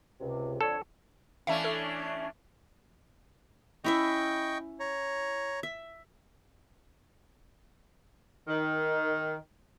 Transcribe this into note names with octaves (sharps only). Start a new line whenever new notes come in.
C#2 C3
F2 D3 A4 C#5
E3 A3 C#4 D4 E5 F5 A5
A4
C#4 E4 D#5 E5 G5 C#6
C#5 A#5
E5
D#3